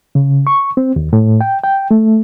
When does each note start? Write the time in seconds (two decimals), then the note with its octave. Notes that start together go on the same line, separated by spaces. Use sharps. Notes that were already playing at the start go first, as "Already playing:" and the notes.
0.15 C#3
0.47 C#6
0.77 C4
0.96 D#2
1.13 A2
1.41 G5
1.64 G5
1.91 A3